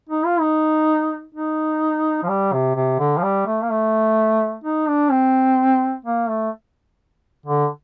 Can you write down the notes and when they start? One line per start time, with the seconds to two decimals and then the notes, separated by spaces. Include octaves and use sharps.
0.09 D#4
0.25 F4
0.41 D#4
1.35 D#4
2.23 F3
2.29 G3
2.53 C3
2.76 C3
2.99 D3
3.18 F3
3.23 G3
3.46 A3
3.62 A#3
3.70 A3
4.64 D#4
4.87 D4
5.11 C4
6.05 A#3
6.29 A3
7.46 D3